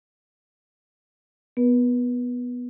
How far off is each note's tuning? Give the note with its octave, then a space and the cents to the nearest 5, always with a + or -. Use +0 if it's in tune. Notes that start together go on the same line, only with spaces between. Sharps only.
B3 +0 B4 -35